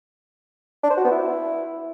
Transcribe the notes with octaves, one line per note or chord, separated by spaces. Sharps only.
D4
C5
F#4
B3
E4